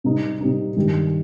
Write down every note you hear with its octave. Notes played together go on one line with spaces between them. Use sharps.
C3 G3 C4 D#4
C3 G3 C4 D#4
G2 D#3 G3